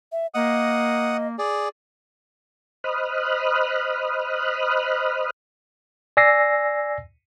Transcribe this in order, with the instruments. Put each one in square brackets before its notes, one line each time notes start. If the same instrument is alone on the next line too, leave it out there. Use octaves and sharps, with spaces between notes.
[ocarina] E5
[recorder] A#3 [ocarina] D#5 [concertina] F#5 D#6
[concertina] G#4 D5
[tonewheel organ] C5 D#5 B5 D#6 F6 F#6
[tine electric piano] D5 G#5 E6 A#6 C7